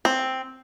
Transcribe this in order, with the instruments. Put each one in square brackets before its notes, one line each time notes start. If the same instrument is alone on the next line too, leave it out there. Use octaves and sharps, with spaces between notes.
[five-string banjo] C4